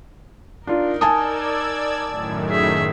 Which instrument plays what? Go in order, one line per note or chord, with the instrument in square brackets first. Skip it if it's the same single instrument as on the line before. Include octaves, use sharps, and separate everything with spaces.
[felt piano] D4 F4 [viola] D#4 A#4
[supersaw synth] D5 E6 G#6 [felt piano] G#5 A5 D#6
[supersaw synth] F#2 A2 D#3
[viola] G#4 E5